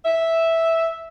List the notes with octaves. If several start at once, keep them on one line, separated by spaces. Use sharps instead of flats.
E5